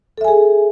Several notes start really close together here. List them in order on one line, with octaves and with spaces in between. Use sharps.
A4 E5 G#5 G#4